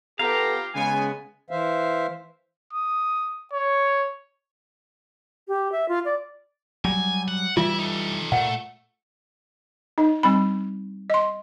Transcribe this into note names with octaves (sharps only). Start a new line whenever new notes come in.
B3 F4 G4 A4 F5 A#5
C#3 G#3 B3 G#5
E3 C5 E5 F5
D#6
C#5
G4
E5
F4
D5
F#3 G3 G#5
F#5
E3 G3 E4 F4 E5
D#4 A4
A#2 A3 F#5
D#4 D#5
G3 C4 B5
D#5 C6